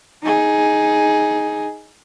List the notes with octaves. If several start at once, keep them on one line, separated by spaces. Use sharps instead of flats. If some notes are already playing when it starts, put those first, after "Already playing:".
D#4 G#4